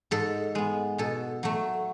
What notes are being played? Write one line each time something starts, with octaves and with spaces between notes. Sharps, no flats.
G#2 A4
G#3 B3
B2 A4
F#3 A3